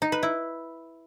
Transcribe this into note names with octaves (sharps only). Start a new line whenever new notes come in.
D#4
B4
E4